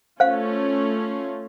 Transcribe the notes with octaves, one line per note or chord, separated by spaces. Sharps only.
A3 C#4 F4 C5 F5